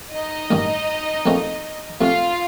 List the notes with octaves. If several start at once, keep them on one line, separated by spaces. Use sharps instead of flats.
D#4 D#5
A1 G2 D#3
A#1 A#2 A3 C4
C3 F3 A3 F4 F5